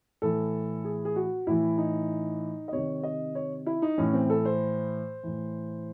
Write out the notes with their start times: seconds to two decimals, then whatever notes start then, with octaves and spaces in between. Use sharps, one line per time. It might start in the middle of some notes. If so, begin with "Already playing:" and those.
0.22 A2 E3 A4
0.84 G#4
1.05 G#4
1.16 F#4
1.47 A2 E3 E4
1.78 D#4
2.68 D#5
2.72 C3 D#3 C#5
3.03 D#5
3.35 C#5
3.66 E4
3.82 D#4
3.98 A2 E3 C#4
4.13 C4
4.30 A4
4.45 C5
5.23 A2 E3